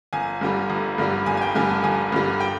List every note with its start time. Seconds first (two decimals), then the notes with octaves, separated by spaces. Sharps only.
0.13 G1 G#5
0.41 G2 D3 G3
0.70 G1
0.98 G2 D3 G3
1.26 G1 G#5
1.37 G#5
1.41 G5
1.55 G2 D3 G3 G#5
1.69 A5
1.84 G1 G#5
2.12 G2 D3 G3
2.40 G5